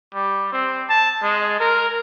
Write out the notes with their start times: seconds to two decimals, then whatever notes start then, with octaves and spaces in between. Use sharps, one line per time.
0.14 G3
0.52 C4
0.89 A5
1.22 G#3
1.60 A#4